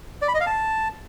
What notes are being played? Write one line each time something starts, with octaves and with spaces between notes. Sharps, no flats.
D5
B5
D#5
F5
A5